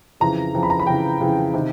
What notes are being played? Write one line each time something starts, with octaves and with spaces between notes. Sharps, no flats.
F2 C#3 E3 A#5
F2 C#3 E3
B5
A#5
B5
F2 C#3 E3 G5
F2 C#3 E3
C3 D#3